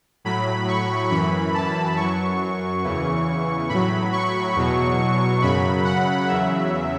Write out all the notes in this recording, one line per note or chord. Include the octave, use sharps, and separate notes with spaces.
A2 F#3 B5
C#6
F#2 E3 B5
A5
F#2 F#3 C#6
E2 C#3 E3
A2 F#3 B5
C#6
E2 B2 F#3
F#2 C#3 F#3 B5
F#5
E2 C#3 F#3 E5